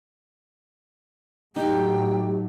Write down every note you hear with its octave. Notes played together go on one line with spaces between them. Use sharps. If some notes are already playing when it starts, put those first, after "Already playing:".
A2 F#3 A3 D#4 G4 G5